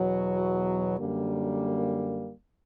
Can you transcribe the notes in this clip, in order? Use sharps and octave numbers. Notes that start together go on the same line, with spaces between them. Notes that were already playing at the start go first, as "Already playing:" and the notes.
Already playing: E2 B2 F#3
F#2 D3 G3 A#3